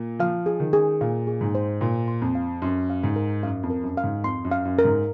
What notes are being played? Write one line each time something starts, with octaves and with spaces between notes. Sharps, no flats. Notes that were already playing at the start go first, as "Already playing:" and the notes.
Already playing: A#2
F3 F5
G#4
D#3
G#4
A#2 F5
G#4
G#2
C5
A#2 C6
C6
F2
F5
F#2 C6
F5
G#2
A#4
F#2 F5
F2
A#4
F#2
F5
G#2
F2 C6
F#2
F5
F#2
A#4
G#2